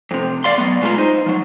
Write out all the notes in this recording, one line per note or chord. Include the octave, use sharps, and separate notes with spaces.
F2 C3
E2 D5 F5 C6
F#3 B3
B2 G#3 E4 F4 A#5 C6
D#4 C5
F3 F#3